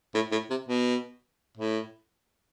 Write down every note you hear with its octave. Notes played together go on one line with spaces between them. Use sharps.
A2
A2
C3
B2
A2